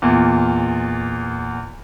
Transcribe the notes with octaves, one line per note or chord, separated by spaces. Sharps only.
E2 A#2